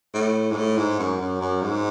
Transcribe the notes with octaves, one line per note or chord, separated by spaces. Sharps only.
A2
G#2
A2
G#2
F#2
F#2
F#2
G#2